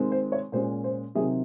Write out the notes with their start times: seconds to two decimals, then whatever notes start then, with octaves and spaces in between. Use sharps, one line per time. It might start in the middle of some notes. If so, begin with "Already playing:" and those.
Already playing: D#3 G#3 C4
0.12 C5
0.32 C#5
0.52 A#2 G#3 C#4 C5
0.84 C5
1.15 C3 D#3 F#3 C4 G#4